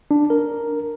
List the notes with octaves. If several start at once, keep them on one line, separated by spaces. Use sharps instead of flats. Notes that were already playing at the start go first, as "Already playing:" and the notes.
D4
A#4